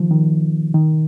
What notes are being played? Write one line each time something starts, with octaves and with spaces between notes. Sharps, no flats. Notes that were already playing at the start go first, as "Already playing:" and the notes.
Already playing: D#3 F3
D#3
D#3